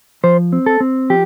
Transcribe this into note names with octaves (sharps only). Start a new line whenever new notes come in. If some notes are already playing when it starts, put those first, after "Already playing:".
F3 C5
C4
A4
C4
F3 G4